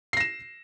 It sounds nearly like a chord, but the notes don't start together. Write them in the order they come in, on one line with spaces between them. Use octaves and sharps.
C7 A#6 E7